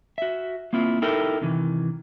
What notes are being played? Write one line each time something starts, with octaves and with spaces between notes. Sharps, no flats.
F#4 E5
A#3 C4 E4 F4
D#4 E4 G4 A4 A#4
C3 D#3 E3